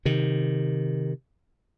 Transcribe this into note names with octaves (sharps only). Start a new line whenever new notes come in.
C3 D#3